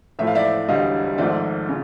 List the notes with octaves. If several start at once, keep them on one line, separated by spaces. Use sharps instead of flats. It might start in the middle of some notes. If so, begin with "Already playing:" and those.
A1 A2 F3 A3 E5
F5
D5 E5
E1 D2 D3 G3 D#5 F5
G#1 G#2 F3 A3 D5 E5
C#3